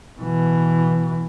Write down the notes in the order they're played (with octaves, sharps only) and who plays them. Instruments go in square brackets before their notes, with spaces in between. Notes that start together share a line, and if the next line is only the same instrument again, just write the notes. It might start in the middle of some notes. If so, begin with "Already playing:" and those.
[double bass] B2 E3